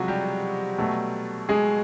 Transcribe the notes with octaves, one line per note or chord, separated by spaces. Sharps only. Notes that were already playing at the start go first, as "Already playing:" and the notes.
Already playing: C3 F3 F#3 G#3 F#4
G3 G4
B2 F#3 A3
G#3 G#4